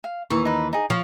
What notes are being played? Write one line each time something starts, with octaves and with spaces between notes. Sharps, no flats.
F5
D#2 E3 C#6
D#4 B4
D#4 G#4
F3 C#5